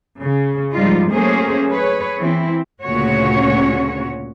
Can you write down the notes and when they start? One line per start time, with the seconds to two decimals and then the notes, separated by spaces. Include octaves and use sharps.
0.21 C#3
0.74 G#2 F3 G3 D#4 F4
1.12 F#3 A3 A#3 C#4 G#4 C5
1.71 G#4 B4 C#5
2.17 E3 C4 E4
2.84 D2 A#2 C#3 C#4 F#4 C#5